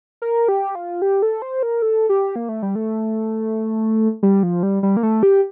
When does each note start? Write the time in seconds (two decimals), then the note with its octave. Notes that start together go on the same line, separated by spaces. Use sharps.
0.22 A#4
0.48 G4
0.75 F4
1.02 G4
1.22 A4
1.42 C5
1.63 A#4
1.82 A4
2.09 G4
2.36 A#3
2.49 A3
2.62 G3
2.75 A3
4.23 G3
4.43 F3
4.63 G3
4.83 G3
4.97 A#3
5.03 A3
5.23 G4